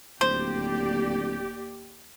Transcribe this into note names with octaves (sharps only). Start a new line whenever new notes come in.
D1 D#2 A#3 G4 C5 D5